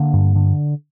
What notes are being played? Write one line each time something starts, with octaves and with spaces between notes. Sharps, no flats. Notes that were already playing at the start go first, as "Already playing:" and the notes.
Already playing: D3 A#3 D4
G2
D3